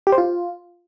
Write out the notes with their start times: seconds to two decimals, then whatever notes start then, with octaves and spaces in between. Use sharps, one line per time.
0.07 G4
0.12 C5
0.18 F4